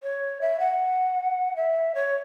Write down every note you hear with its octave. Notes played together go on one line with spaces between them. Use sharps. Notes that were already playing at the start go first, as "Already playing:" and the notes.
C#5
E5
F#5
E5
C#5